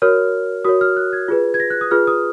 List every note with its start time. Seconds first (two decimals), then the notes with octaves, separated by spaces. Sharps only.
0.02 F#4 A#4 C#5 F6
0.64 F#4 A#4 C#5 D#6
0.81 F6
0.97 F#6
1.13 G#6
1.28 F4 G#4 B4
1.54 G#6
1.60 A#6
1.70 F#6
1.81 D#6
1.91 F4 G#4 B4 F6
2.07 D#6